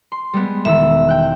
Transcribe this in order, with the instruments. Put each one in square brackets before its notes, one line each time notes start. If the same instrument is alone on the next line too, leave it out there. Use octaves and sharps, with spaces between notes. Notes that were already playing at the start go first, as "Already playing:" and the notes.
[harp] C6
G3 G#3 B3
[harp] E1 D#3 E6 [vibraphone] E5
[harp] G5 F#6